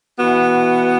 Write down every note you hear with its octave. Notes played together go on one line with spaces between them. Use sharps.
E3 B3 F#4